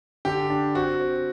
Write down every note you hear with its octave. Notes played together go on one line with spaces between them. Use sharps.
D3 G4
D4
C4 F#4
C4